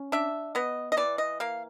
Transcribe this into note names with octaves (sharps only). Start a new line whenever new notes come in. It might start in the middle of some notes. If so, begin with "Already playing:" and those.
Already playing: C#4
D4 E5
B3 D#5
D#5
E3 D5
D#5
A#3 F5